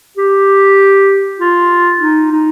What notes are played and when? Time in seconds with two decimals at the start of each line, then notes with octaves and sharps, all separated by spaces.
0.17 G4
1.40 F4
2.01 D#4
2.32 D#4